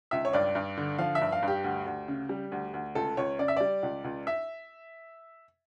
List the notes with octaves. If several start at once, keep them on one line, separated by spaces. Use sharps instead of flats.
C#2 E5
C#5
G2 D5
G2
D3
F3 F5
E5
G2
F5
G2 G4
D2
D2
C#3
G3
D2
D2
C#2 A4
C#2 C#5
C#3 D5
E5
G3 D5
C#2
C#2
E5